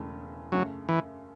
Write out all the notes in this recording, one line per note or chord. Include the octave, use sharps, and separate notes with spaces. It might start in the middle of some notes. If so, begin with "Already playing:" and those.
Already playing: E1 E2 C#3 A3
F#2 C#3 F#3 A3
E3